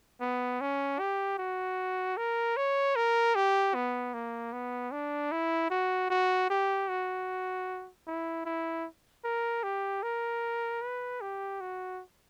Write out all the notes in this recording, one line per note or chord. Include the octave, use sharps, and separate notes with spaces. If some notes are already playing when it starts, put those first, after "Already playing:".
B3
C#4
G4
F#4
A#4
C#5
A#4
G4
B3
A#3
B3
D4
E4
F#4
F#4
G4
F#4
E4
E4
A#4
G4
A#4
B4
G4
F#4